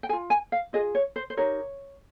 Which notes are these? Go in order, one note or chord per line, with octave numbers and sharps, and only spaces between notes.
G5
G#4 G#5
F4
G#5
F5
F4 G#4 D#5
C#5
C5
C5
D#4 G4 A#4 C#5